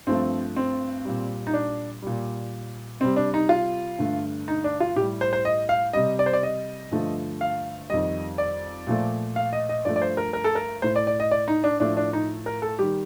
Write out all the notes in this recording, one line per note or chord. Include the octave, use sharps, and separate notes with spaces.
G2 F3 A3 C4
C4
A#2 G3
D#4
D4
A#2 G3
C3 G3 C4
D4
D#4
F4
G2 D3 A3
D#4
D4
F4
A2 G3 G4
C5
C5
D#5
F5
C3 G3 D#5
D5
C5
D5
D#5
G2 D3 F3 A3
F5
F2 D#3 G3 D#5
D5
A#2 F3 A3
F5
D#5
D#5
G2 F3 A3 D5
D5
C5
A#4
A#4
A4
A#4
A2 A3 C5
D5
D5
D#5
D5
D#4
D4
A2 F3 A3 D4
D4
D#4
A#4
A4
D#3 G3 G4